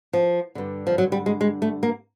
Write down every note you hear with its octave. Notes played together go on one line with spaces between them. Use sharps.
F3
G2 D3
F3
F#3
G3
G#3
G#3
A3
A#3